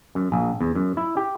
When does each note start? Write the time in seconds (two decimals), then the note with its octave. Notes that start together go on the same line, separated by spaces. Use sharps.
0.15 F#2
0.32 A#1
0.61 E2
0.75 F#2
0.97 E4
1.17 G4